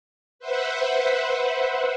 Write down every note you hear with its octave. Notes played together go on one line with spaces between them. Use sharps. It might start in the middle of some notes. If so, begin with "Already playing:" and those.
B4 C5 E5 F#5